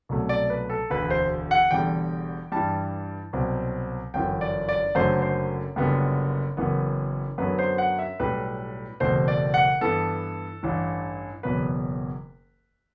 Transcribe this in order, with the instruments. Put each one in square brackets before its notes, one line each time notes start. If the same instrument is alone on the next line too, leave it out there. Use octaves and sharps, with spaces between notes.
[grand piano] C2 B2 F#3 A3
D5
B4
A4
E1 D2 D3 B4
C5
F#5
E1 E2 D3 G3 G5
G2 E3 G3 A5
C2 B2 F#3 C4
G1 F#2 E3 G5
D5
D5
F#1 F#2 D3 F#3 A3 C5
C5
F#1 F#2 D3 G3 B3
F#1 F#2 E3 B3
F#2 D3 F#3 B3 B4
C5
F#5
E5
B1 A2 G3 B4
F#1 E2 B2 A3 C4 C5
D5
F#5
G2 E3 B3 A4
A1 G2 E3
F#1 E2 B2 F#3 B3 B4